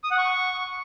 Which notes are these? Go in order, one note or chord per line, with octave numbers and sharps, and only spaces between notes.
D#6
F#5
C#6